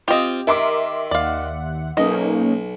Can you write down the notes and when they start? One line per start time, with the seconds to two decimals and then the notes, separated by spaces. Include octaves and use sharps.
0.08 C4 F4 G4 D#5
0.47 D#3 A#4 E5 C6 D6
1.11 D#2 D5 F5 F#5
1.97 B1 A#3 C#4 D#4 D#5